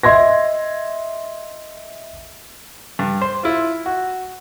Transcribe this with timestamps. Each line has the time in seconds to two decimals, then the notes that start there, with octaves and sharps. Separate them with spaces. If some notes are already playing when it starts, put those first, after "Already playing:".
0.03 D#5 E5 C6 G#6 A#6
2.99 G2
3.22 C5
3.43 E4 F4
3.86 F#4